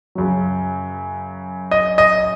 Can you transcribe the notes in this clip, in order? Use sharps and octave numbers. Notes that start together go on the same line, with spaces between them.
F#2 C#3 F#3
D#5
D#5